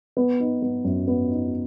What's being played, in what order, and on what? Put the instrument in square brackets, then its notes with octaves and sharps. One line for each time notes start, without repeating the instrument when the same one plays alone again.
[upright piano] B3
D#4
B3
F#2
B3
D#4